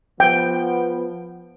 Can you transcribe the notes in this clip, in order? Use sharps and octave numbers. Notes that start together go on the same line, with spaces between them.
F3 B3 G5